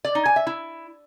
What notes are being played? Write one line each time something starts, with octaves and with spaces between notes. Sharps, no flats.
D5
D#4
G#5
E5
E4